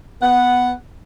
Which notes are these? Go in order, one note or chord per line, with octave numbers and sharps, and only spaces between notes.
B3 F#5